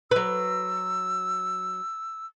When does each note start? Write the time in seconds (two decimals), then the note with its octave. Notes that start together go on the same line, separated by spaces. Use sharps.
0.11 F#3 B4 E6